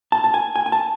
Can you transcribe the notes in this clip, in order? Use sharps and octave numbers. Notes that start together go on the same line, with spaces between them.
A5
A5
G#5
G#5
G#5
A5